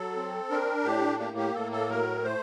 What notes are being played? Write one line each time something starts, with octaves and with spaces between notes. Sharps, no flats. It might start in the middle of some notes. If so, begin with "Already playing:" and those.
Already playing: F#3 A4
C4
D4 A#4
A2 G4
A#3 G4
G4
A2 A4
A4
F#3 A#4
A3 C5